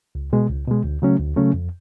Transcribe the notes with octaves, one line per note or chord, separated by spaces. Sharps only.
C#2
B2 G#3
C#2
B2 G#3
D2
C#3 F#3 A3 C#4
D2
C#3 F#3 A3 C#4
F2